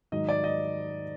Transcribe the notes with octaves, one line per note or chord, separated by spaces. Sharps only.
G#2 D#3 F#3 D#5
D5
D#5